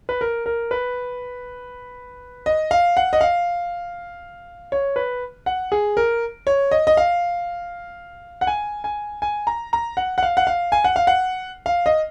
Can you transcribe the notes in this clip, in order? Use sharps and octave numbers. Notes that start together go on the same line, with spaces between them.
B4
A#4
A#4
B4
D#5
F5
F#5
D#5
F5
C#5
B4
F#5
G#4
A#4
C#5
D#5
D#5
F5
F#5
G#5
G#5
G#5
A#5
A#5
F#5
F#5
F5
F#5
F5
G#5
F#5
F5
F#5
F5
D#5